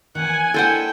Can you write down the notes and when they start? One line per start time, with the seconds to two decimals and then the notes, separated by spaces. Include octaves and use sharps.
0.15 E2 D#3 F#5 G#5
0.54 G#3 A#3 D4 E4 A4 C5 F#5 G5